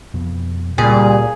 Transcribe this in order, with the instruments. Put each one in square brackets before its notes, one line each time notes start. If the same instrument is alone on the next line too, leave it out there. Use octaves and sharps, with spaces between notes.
[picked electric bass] F2 B2
[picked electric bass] C#2 [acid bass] A#2 [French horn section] G3 [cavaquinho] G#4